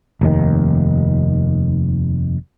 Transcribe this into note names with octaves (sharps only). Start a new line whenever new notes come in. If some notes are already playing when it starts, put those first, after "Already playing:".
F1 D#2 D#3